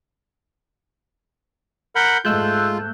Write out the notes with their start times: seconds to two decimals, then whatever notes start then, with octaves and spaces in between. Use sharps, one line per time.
1.95 A#4 F#5 B5 G6
2.25 G#2 G#3 A3 F4 E6 F#6 G6